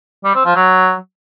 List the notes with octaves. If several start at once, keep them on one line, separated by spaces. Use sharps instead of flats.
G3
C4
F3
F#3